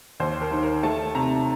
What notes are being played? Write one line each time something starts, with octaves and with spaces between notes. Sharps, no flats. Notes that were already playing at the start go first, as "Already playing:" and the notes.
D#2 C5
A#4
D#3
A#4
A3 A5
C3 A#5